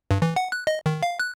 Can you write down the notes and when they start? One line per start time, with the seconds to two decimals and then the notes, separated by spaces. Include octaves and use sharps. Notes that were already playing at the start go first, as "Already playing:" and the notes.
0.11 G2
0.22 E3
0.36 F#5
0.52 F#6
0.67 D#5
0.86 D#3
1.03 F5
1.20 F#6